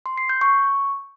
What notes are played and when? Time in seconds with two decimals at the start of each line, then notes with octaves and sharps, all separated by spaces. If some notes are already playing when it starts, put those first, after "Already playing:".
0.06 C6
0.18 C7
0.29 G6
0.41 C#6